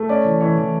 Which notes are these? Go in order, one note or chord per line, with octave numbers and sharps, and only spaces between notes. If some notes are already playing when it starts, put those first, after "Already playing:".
Already playing: A3
C#4 D5
E3
E3 C#5
E3